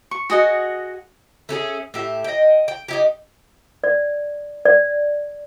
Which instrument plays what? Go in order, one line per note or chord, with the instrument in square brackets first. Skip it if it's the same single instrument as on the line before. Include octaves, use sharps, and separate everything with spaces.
[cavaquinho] C#6
F#4 G#4 D#5 F#5
[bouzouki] A3 C#4 G4 G#4
A2 G4 E5
D#5 G5
G5
D#4 E4 G4
[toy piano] D5
D5